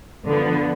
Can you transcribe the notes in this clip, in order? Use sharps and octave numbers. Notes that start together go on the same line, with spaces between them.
D3 F3 B3